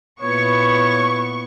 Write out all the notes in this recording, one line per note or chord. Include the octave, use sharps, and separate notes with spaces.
A#2 B3 E4 C#5 C#6